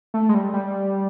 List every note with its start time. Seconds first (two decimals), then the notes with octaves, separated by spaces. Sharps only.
0.14 A3
0.29 G#3
0.34 G3
0.54 G3